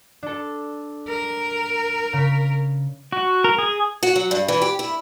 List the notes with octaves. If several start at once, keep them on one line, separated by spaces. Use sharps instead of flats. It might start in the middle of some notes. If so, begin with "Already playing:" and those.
D4 A4
A#4
C#3 B6
F#4
A#4
G#4
F#4
F#3
G2
E3
G4
E4